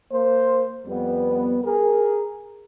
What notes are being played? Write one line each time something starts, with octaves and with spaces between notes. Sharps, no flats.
A#3 C5
F2 G3 B3
G#4 A#4